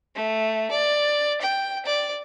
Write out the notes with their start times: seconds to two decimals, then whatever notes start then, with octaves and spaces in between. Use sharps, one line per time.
0.15 A3
0.71 D5
1.41 G5
1.85 D5